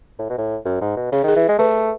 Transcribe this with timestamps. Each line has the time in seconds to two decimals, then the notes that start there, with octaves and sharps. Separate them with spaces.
0.19 A2
0.29 B2
0.38 A2
0.65 F#2
0.81 G#2
0.97 B2
1.12 C#3 G#4
1.24 D#3
1.28 G#4
1.36 E3
1.48 G#3
1.59 A3 B4